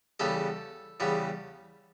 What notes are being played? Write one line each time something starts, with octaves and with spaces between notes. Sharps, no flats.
E2 C#3 G3 B3 A4
E2 C#3 G3 B3